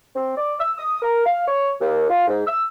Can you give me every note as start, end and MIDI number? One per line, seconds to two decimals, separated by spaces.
0.16 0.34 60
0.37 0.53 74
0.60 0.73 88
0.78 1.02 87
1.02 1.25 70
1.26 1.46 77
1.47 1.72 73
1.81 2.10 39
2.10 2.25 65
2.28 2.43 44
2.47 2.63 88